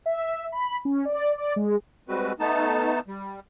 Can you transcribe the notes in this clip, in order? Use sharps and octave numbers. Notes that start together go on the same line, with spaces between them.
E5
B5
C#4
D5
D5
G#3
G3 G#3 C4 F#4 B4
A3 B3 D#4 A5
G3